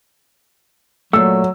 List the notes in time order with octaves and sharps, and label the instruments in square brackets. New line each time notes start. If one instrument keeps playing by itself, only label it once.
[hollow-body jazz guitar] A#2 A3 [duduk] F#3 [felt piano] E6